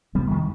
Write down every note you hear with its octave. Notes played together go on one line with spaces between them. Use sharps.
F2 C3 G3 B3
D#3 G3